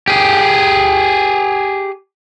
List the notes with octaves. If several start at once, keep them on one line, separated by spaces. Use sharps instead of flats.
G4 G#4